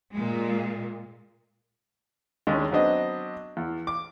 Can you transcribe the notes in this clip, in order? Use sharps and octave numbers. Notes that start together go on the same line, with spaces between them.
A#2 G#3
D#2 G#3 C#4 D4
F#3 B3 C4 D4 D#5
E2
D6